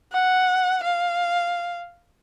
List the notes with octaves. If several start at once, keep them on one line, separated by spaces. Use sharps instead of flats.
F#5
F5